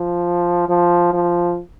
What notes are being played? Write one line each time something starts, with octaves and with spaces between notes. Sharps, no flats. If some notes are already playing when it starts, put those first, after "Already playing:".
Already playing: F3
F3
F3